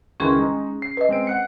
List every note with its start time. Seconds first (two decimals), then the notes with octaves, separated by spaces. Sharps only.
0.20 C#2 D#3 E3 C#4 G#4 C6
0.39 G#3 D#4
0.82 C7
0.97 B4 D#5
1.09 G#3 C4 D7
1.27 F#5 F#6 C#7